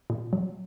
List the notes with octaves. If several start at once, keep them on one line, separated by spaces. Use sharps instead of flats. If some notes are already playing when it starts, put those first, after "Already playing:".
A#2
F#3